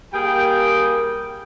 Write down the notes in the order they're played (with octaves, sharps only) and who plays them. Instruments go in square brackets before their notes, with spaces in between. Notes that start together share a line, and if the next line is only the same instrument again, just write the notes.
[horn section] G3 A#3 G#4 G5